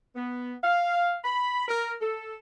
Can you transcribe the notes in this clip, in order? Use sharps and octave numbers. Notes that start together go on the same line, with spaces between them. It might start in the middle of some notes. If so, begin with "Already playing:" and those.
B3
F5
B5
A#4
A4